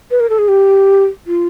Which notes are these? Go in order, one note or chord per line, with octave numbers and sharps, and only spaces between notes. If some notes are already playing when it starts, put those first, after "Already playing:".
B4
A#4
A4
G#4
G4
F4